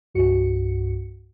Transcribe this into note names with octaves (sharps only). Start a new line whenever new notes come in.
C2 G2 F#4 C#7